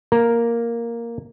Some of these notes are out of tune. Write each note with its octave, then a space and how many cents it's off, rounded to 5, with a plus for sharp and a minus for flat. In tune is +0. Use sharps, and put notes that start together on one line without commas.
A#3 +0 A#4 +0